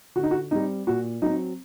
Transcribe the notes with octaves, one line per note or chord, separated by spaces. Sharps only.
D3 F#4
D#4
F#4
G3 C4 D#4
A#2 F#4
F#3 C4 D#4